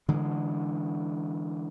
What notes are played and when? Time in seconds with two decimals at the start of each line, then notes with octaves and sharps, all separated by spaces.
0.08 D3 E3 G#3